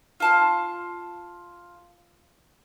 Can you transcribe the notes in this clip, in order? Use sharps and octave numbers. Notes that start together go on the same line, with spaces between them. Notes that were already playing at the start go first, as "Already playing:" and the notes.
F4 A5 C6